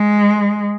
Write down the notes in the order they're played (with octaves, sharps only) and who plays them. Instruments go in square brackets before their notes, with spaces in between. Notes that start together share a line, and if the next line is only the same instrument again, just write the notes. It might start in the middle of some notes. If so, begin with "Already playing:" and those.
Already playing: [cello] G#3